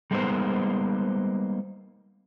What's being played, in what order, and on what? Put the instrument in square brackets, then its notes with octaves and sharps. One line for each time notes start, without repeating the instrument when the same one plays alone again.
[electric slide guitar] G3 G#3 A#3 B3 D#4 C5